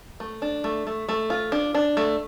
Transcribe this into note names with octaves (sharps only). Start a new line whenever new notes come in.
A3
D4
A3
A3
A3
F4
D4
D4
A3